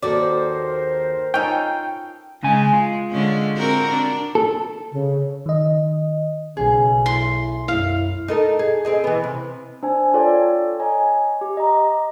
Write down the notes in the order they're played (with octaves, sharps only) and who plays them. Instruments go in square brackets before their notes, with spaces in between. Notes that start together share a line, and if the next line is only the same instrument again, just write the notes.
[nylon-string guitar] D#2 F#4 A4 [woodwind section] A#4 C5 [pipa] D5
[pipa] C#4 D#4 A4 [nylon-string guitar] F4 [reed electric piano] G5
[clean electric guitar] C#3 G#5 [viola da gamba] G#3
[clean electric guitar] F4
[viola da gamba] D3 G#3 C#4
C4 F#4 A#4
D4
[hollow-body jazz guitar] A4
[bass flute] C#3
[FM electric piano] D#3 D#5
[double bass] B1 [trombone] C#3 [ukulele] G#4
[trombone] E4 [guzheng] C6
[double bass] F#2 [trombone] E4 [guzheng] F5
[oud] D#4 A4 A#4
G#4
C4 G#4 D#5
E3 B3
C3
[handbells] D4 C5 G#5
F4 A4 C#5 D5 G5
C#5 D#5 G#5 A#5
G4
D#5 A#5